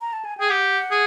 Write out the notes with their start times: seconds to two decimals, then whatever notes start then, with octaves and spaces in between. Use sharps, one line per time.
0.00 A#5
0.13 A5
0.25 G#5
0.37 G#4 G5
0.49 G4 F#5
0.91 G#4